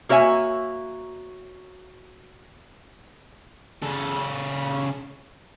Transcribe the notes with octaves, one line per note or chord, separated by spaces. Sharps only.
A#3 F#4 C#5 E5 G#5
C#3 A4